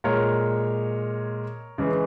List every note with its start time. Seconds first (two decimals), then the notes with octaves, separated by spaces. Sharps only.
0.04 A#2 G#3 A#4 C#5
1.78 C#3 E3 G#3